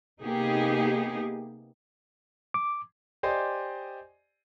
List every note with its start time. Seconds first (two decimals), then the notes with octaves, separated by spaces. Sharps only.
0.22 C3 A#3 B3 D#4 G4 G#4
2.54 D6
3.23 G4 C5 D5 D#5 G#5 C6